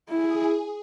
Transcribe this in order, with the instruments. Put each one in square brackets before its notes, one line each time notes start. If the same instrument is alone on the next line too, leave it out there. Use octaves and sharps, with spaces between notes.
[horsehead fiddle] E4 [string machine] G#4